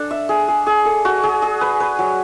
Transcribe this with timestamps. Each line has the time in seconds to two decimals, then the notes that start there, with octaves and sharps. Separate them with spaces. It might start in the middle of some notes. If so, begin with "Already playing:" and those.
Already playing: D4 A4
0.11 E5
0.29 G#4
0.48 G#4
0.67 G#4
0.85 A4
1.05 F#4
1.23 G#4
1.42 G#4
1.61 B4
1.80 B4
1.99 F#3